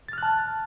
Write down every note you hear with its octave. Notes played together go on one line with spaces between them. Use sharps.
A5 F6 F#6 A6